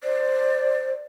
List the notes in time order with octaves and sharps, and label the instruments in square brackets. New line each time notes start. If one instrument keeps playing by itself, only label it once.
[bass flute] C5 [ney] D5